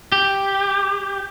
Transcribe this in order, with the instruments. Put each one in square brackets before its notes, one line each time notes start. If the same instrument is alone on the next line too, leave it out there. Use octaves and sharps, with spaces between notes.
[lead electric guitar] G4